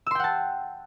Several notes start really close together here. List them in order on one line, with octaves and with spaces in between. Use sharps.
E6 C6 G5 F#5 A5